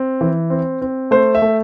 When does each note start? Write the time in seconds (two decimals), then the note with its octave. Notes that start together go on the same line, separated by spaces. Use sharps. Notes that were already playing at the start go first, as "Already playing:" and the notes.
Already playing: C4
0.21 E3
0.50 C4
0.82 C4
1.11 A3 C5
1.35 E5
1.42 A3